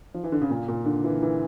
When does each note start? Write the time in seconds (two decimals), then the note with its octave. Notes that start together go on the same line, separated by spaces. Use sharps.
0.14 F3
0.24 E3
0.32 D3
0.41 C#3
0.50 A#2
0.68 A#2
0.85 D3
1.04 E3
1.22 E3